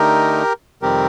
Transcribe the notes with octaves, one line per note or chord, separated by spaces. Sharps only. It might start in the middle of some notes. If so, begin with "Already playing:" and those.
Already playing: D3 A3 D#4 G4 A#4
F2 C3 D#3 G3 C4 G4 A#4